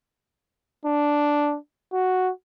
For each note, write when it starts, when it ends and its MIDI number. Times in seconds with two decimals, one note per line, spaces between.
0.85 1.57 62
1.93 2.31 66